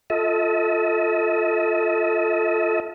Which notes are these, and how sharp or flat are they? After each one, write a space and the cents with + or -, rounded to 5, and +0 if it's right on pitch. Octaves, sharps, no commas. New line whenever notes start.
F4 +0 A4 +0 D#5 +45